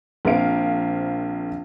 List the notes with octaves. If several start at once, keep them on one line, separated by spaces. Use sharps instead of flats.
A#1 C4 A#4 F5 D7